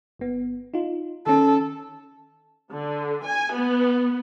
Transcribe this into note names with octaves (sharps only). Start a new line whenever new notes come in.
G1 B3
D#4 F4
D#3 C#4 A4
D3
G#5
B3